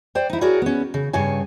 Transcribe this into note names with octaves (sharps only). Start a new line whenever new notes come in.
C5 D5 G5
D#4 E4
F#4 G#4 A#4 C#5 D5
B3 C#4
C#3
G2 C#3 C#5 G#5